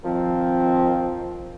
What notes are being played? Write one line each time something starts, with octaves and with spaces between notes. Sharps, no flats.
D#3 F3 C4